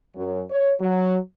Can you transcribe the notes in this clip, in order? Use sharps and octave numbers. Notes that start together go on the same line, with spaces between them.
F#2
C#5
F#3